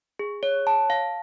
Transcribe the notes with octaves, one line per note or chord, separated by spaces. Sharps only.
G#4
C#5
A5
F5